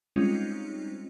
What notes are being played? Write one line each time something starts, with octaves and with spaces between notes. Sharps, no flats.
G3 G#3 C4 C#4 D#4 F4